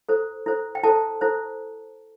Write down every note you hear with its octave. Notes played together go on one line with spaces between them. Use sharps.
E4 A4 C5
E4 A4 C5
G5
E4 A4 C5 A5
E4 A4 C5